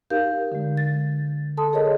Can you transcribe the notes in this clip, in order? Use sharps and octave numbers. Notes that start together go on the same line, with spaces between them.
D#4 G4 A#4 F5 G6
D3 G#3
A6
A4 A5 C6 D#6
G#4 A#4 C#5 D#5